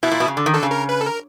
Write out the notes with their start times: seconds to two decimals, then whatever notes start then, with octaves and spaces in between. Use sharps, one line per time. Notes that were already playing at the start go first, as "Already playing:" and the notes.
0.03 B2 E4
0.11 A#2
0.20 B2
0.28 C#3
0.37 D3
0.46 D#3
0.54 D3 A4
0.63 C#3
0.71 A#4
0.89 B4
1.01 A4
1.06 A#4